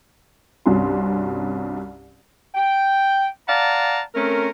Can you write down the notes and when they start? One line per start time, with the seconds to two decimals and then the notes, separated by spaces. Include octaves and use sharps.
0.66 C2 G2 C3 C#4 F#4 C6
2.55 G5
3.48 D5 F5 F#5 A5 A#5
4.15 A3 C4 C#4 A#4